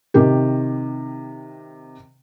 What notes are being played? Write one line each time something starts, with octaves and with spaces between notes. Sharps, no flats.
C3 D#3 G4